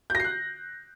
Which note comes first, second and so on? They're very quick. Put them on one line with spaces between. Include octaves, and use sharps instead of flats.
G6 A#6 C7 F#6